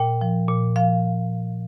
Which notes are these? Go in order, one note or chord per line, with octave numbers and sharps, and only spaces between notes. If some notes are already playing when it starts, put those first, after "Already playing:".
Already playing: A#2 G5
F3
A#2
F3 F5